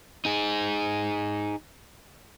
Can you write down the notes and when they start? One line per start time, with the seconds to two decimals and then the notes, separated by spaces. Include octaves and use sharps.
0.25 D#4 G#4